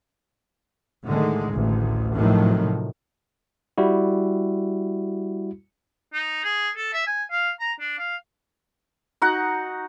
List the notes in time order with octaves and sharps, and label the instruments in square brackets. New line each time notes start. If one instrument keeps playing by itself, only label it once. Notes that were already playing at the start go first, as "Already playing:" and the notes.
[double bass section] A2 D3 D#3 G#3
A1 D2
A2 C3 D#3 F3 F#3
[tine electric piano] G3 E4 F#4
[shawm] D#4
G#4
A4
E5
G#5
F5
A#5
D4
F5
[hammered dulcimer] D#4 F#4 F#5